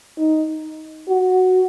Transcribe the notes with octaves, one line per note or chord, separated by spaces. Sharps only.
D#4
F#4